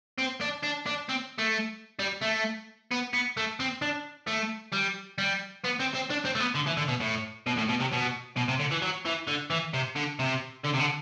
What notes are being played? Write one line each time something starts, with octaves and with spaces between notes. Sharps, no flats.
C4
D4
D4
D4
C4
A3
G3
A3
B3
B3
A3
C4
D4
A3
G3
G3
B3
C4
C4
D4
C4
A3
B3
D3
E3
D3
B2
A2
B2
A2
B2
C3
B2
B2
C3
D3
E3
F#3
E3
D3
E3
C3
D3
C3
D3
C3
D3